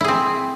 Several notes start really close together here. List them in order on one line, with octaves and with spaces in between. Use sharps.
E4 G#4 C4